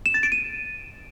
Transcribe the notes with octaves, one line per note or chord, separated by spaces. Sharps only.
E7
A6
D7
D#7